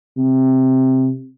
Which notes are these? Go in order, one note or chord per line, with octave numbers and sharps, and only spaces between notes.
C3